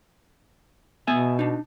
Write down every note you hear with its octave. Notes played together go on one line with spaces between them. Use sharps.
B2 B3 E5 G#5
D4 D#4